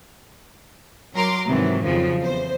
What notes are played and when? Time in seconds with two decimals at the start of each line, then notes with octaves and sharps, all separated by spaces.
1.15 F#3 A#4 A#5 C6 D6
1.47 G#2 C3 D#3 E3 F#3
1.84 F2 C#3 F3 F#3
2.21 E2 C5